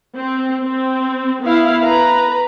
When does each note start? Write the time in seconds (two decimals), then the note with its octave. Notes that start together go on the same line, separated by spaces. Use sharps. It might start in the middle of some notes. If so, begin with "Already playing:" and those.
0.16 C4
0.65 C4
1.43 B3 E4 F5
1.83 B4 A#5